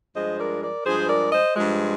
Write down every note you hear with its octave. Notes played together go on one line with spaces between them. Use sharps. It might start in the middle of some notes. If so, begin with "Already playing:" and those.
G2 F3 G#3 C5 D#5
A#4 D5
A#4 D5
G2 F3 G#3 G#4 C5
A#4 D5
C5 D#5
G2 F3 G#3